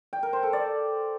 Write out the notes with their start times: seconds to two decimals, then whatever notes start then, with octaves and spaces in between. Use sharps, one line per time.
0.13 G5
0.23 A#4
0.33 C5
0.43 A4
0.53 D5